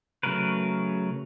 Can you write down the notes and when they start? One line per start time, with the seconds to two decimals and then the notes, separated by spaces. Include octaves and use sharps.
0.23 C#3 F#3 A3 A#4 B4